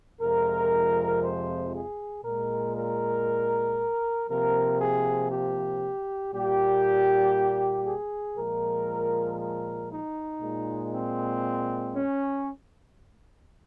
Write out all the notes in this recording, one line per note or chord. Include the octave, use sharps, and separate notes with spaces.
F2 C3 F3 G#3 A#4
C5
G#4
A#2 G#3 A#4
A#4
C3 F3 A#3 A#4
G#4
G4
A#2 G3 A#3 G4
G#4
A#2 F3 G#3 A#4
A#4
D#4
A#2 G#3
C4
C#4